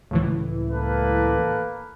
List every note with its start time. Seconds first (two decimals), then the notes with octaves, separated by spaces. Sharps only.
0.11 C#2 A2 E3
0.69 A#3 A4 B4